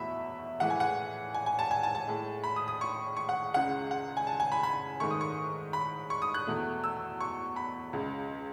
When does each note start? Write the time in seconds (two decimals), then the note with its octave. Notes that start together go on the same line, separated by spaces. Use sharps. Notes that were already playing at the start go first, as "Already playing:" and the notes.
Already playing: E2 B2 A3 E5 B5
0.60 A2 E3 G#3 F#5
0.70 G#5
0.80 F#5
1.34 G#5
1.46 G#5
1.59 A5
1.71 G#5
1.83 A5
1.95 A5
2.07 A2 G#3
2.44 B5
2.56 D#6
2.68 D#6
2.81 C#6
3.17 C#6
3.29 F#5
3.53 C#2 C#3 G#3 F#5
3.91 F#5
4.17 G#5
4.27 A5
4.40 G#5
4.52 B5
4.63 B5
5.00 G#2 D#3 A3 C#6
5.11 D#6
5.21 C#6
5.73 B5
6.10 C#6
6.22 D#6
6.34 F#6
6.47 E2 B2 A3
6.84 E6
7.21 C#6
7.56 B5
7.93 C#2 C#3 G#3